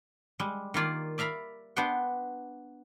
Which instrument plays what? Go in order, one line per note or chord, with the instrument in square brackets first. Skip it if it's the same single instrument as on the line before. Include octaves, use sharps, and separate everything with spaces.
[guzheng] G3 G#3
D#3 A#3 F4 D5
D5 E5 F5 A#5 B5
B3 D4 C5 F#5 G5